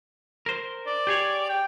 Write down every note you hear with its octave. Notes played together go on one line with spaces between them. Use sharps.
A#4 C5
D5
G4 G#4 C#5
G5